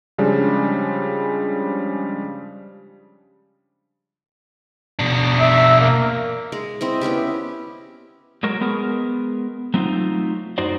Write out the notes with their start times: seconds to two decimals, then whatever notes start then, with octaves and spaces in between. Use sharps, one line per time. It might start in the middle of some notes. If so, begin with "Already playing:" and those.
0.18 C#3 F3 G3 G#3 D4
4.99 B2 D4
5.40 E5
5.80 A#3
6.52 G#3
6.81 C4 E4 D#5
7.01 B3 C#4 E4 G4
8.43 F#3 G#3 F#4 A#4
8.61 G#3 B3 G#4 A#4
9.74 F#3 A3 C4 D#4 F4
10.58 F#2 D#4 F#4 C5 D5